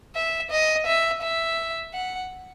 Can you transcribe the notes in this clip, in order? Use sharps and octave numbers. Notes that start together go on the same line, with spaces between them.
E5
D#5
E5
E5
F#5